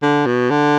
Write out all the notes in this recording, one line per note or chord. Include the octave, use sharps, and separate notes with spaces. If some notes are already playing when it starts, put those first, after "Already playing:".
D3
B2
D3